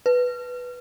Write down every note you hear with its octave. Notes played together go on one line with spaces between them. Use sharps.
B4